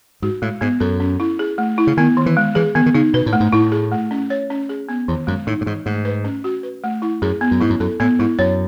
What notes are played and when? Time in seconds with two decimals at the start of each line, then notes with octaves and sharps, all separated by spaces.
0.22 G#2 F#4
0.42 A2 G#3
0.61 G#2 B3
0.80 F#2 A4
1.00 C#4
1.20 E4
1.39 G#4
1.58 A3
1.78 E4
1.87 C#3
1.97 D#3 B3
2.17 D#3
2.26 E3
2.37 G#3
2.55 E3 G#4
2.75 D#3 B3
2.86 D#3
2.95 C#3 D#4
3.14 B2 B4
3.26 A2
3.33 A3
3.40 G#2
3.53 A2 E4
3.72 G#4
3.91 A3
4.11 C#4
4.30 C#5
4.50 C#4
4.69 G#4
4.89 B3
5.08 E2 D#3
5.27 F#2 G#3
5.47 A2 D#4
5.61 A2
5.66 G#2 E3
5.86 G#2 A3
6.05 B4
6.24 C#4
6.44 F#4
6.63 B4
6.84 A3
7.02 E4
7.22 F#2 G#4
7.41 B3
7.51 F#2
7.60 G#2 E4
7.70 F#2
7.80 F#2 A4
8.00 A2 B3
8.19 G#2 E4
8.39 F#2 C#5